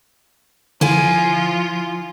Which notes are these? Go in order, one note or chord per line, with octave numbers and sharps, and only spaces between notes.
D3 F3 E4 F4 F5 G#5